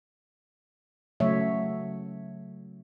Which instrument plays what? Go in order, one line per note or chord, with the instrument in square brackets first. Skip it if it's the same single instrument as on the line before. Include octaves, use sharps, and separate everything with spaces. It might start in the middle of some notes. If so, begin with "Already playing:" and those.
[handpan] C#3 F#3 A3 C#5 E5